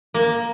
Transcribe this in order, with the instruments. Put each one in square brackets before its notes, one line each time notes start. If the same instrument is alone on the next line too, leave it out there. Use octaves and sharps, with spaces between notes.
[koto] A#3